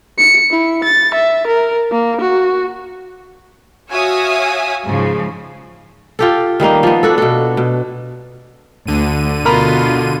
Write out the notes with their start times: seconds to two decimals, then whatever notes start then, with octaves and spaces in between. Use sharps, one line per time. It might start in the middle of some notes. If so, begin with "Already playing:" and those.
0.18 C#7
0.51 E4
0.85 A6
1.15 E5
1.48 A#4
1.92 A#3
2.21 F#4
3.90 F#4 C#5 E5 F5 G#5 D#6
4.85 G#2 C#3 F3
6.19 F4 G4 A4
6.60 D#3 G3 A#3 D#4
6.83 F3 B3
7.03 D4 F#4 A4
7.18 B2 A4
7.57 B2
8.87 D2 D3 D#7
9.45 B2 F4 A#4 A#5 B5